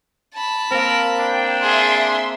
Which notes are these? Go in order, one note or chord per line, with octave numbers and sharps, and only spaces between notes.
A5 B5
A#3 C4 A#4
D4 G5
G#4 E5 C6